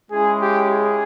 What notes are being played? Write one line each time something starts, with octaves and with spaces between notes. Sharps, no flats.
G#3 C#4 E4 G#4
G4
G#4